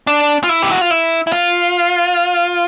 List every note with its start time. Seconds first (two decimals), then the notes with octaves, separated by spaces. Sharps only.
0.07 D4
0.44 F4
0.49 E4
0.63 G4
0.72 F#4
0.81 F4
0.91 E4
1.27 E4
1.33 F4